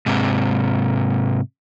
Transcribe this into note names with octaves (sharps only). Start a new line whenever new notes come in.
G#2 C3